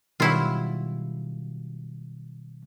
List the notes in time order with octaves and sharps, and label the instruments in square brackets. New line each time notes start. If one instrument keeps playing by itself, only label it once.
[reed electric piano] B2 D#3 G3 [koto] F#3 E4 F4